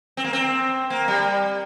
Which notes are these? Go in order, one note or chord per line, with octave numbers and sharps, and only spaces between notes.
C4
A#3
C4
A#3
G3